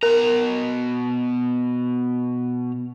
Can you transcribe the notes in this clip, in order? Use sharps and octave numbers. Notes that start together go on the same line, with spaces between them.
B2 A#4 A#5